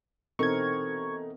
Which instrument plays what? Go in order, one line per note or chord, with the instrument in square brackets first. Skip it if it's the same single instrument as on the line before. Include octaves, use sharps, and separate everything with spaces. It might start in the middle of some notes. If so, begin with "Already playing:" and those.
[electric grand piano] B2 E3 D#4 [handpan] C4 A#4 [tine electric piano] A4 [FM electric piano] C#6 G#6